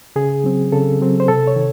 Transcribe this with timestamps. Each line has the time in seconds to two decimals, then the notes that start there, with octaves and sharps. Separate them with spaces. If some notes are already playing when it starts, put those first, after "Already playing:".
0.16 C#3 G#4
0.44 F#3 C4
0.72 C#3 A4
1.01 F#3 C4
1.20 C5
1.28 C3 A4
1.47 C#5
1.56 D#3